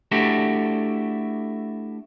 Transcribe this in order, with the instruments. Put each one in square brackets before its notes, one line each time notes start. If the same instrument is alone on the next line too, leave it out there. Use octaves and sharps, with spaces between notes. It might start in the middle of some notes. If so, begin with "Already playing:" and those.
[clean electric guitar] A3 D4 E4 F#4 G4 A4